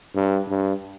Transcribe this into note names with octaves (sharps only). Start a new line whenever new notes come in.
G2
G2